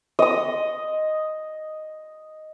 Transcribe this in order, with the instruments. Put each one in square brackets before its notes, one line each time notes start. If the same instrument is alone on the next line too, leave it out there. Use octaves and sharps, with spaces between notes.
[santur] D#5 D#6